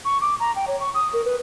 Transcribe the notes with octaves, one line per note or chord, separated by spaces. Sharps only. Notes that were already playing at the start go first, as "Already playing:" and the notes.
C#6
D6
A#5
G5
C#5
C#6
D#6
A#4
B4